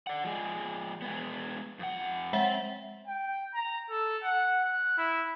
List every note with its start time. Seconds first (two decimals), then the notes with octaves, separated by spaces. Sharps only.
0.07 D5 F#5
0.24 F3 G#3 G#4
1.02 G#3 B3
1.79 F2 F#5
2.33 G#3 C4 C5 E5 F#5
3.07 G5
3.55 A#5
3.90 A4
4.23 F#5
4.63 F#6
4.98 E4